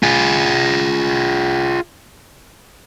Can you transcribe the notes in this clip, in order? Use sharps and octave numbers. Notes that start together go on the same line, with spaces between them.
F4 G#4